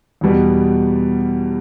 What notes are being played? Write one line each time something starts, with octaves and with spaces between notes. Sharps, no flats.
E2 B2 G3 B3